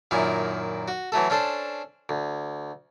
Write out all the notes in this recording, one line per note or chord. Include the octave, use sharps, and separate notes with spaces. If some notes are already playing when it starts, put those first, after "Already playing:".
F#2 A#2 D#3 E4 G#5
F#4
E3 F#3 A3 A4
C#4 D4 A4 C5
D2